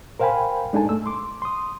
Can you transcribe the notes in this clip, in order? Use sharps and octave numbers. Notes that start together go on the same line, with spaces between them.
A#4 C5 F5 G5 G#5 B5
G#3 D4 D#4 A4 G#5 A5
A3 E6
C6 D6
C6 D#6